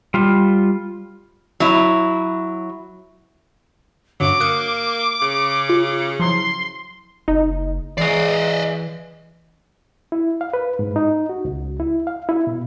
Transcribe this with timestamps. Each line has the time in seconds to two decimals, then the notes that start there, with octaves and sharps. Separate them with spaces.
0.14 G3 F4
1.60 F#3 E4
4.20 G2 D3 F#3 D6
4.40 A#3 D#6 F#6 C#7
5.22 C#3
5.70 F4
6.20 F3 F#3 E4 C6
7.28 F#1 D#4
7.98 E2 E3 G#3 D5 D#5 C7
10.12 E4
10.41 F5
10.54 B4
10.79 G#2
10.96 D#4
11.29 F#4
11.45 C#2
11.80 E4
12.07 F5
12.29 E4
12.47 B2